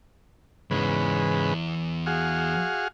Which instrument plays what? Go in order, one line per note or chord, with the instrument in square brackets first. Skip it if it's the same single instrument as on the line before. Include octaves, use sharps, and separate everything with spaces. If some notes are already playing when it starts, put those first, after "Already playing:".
[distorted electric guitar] E2 E3 [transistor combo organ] G#2 C#3 B4
[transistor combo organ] F#4 G#4 F5